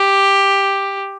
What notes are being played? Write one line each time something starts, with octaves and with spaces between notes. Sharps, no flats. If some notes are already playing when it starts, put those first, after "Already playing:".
Already playing: G4